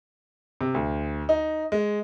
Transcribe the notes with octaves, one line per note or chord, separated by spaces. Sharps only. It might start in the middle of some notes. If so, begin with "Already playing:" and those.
C3
D2
D#4
G#3